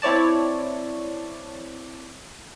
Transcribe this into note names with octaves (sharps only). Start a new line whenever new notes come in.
C4 E4 C#5 D5 A5